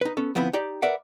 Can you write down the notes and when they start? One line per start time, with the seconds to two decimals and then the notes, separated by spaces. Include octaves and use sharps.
0.01 D#4 B4
0.17 B3 C#4 A4
0.35 D2 F3 B3 C4 E4 B5
0.53 D#4 G4 D5
0.82 A#4 B4 D5 E5 F#5